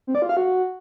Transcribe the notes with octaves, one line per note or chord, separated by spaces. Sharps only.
C4
D5
F4
F5
F#4